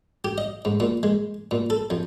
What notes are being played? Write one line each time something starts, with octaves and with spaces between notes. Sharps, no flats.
G4
D#5
G#2
A#2
G#3
A#2
A4
F2